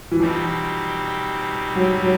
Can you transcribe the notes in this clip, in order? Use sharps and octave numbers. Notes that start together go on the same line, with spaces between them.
E3
B2 F3 G3 C4 D#4 G4
F#3
F#3